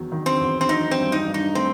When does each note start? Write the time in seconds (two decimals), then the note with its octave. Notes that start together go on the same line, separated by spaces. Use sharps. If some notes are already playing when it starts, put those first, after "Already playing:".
Already playing: E2 D#3 F#3 B3
0.12 D#3
0.26 C4
0.41 E2
0.61 C4
0.69 F#3 D#4
0.91 C4
0.97 G2
1.12 D#4
1.26 G2
1.34 D#4
1.55 A3 C4